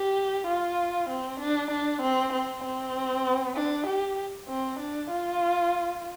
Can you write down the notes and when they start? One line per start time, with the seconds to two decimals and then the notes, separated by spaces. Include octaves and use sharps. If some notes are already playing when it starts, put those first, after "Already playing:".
Already playing: G4
0.47 F4
1.09 C4
1.40 D4
1.71 D4
2.02 C4
2.33 C4
2.64 C4
3.56 D4
3.87 G4
4.48 C4
4.80 D4
5.11 F4